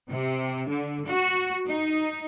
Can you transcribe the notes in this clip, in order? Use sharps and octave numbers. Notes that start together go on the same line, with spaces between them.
C3
D3
F#4
D#4